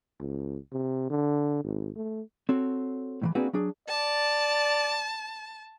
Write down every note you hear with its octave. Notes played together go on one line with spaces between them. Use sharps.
C#2
C3
D3
G#1
A3
C4 F#4 A4 C#5
A2 C#3 E3
A#3 C4 D4 F#4 G#4 B4
F#3 D4 G#4
D5 A5